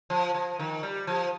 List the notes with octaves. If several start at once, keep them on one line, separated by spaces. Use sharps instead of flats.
F3
F3
D#3
G3
F3